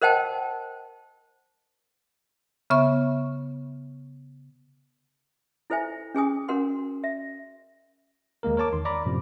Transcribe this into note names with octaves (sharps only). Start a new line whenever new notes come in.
A#4 C5 D#5 F#5 G5 A5
C#3 B3 E5 C#6
E4 A4 C5 E5 G#5
C#4 G#4 G#5 D#6
C#4 F#4 A#4 F#5 C6
E5
D#2 G#3 A#3 A#4
A#4 C#5 A5 D6
E2 D#3 C6
D5 A#5 B5 D6
F#2 A2 C3 F3